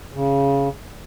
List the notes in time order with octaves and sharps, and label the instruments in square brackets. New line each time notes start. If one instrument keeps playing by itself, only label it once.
[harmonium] C#3